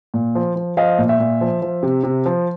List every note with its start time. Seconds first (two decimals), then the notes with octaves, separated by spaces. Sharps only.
0.14 A#2
0.35 F3
0.55 F3
0.77 F3 D#5 F5
0.98 A#2
1.09 E5
1.20 A#2
1.41 F3
1.62 F3
1.83 C3
2.03 C3
2.26 F3